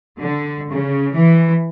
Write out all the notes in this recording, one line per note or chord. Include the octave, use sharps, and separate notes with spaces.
D3
C#3
E3